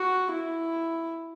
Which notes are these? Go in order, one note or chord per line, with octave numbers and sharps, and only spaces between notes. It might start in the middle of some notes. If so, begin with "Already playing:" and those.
Already playing: F#4
E4